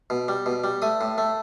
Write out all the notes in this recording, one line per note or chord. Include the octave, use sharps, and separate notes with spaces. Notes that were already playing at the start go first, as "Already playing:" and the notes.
B2
G3
B2
G3
A3 D#6
A2
A3